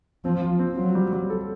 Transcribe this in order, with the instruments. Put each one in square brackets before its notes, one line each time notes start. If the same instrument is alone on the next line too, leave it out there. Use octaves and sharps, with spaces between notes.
[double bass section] F3 [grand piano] C4
[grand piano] F4
C4
[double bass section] F#3 [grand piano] F4
[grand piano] G3
G3
A4